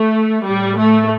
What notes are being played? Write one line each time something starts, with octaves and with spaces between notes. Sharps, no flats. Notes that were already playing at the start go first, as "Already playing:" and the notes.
Already playing: A3
A2 G3
A3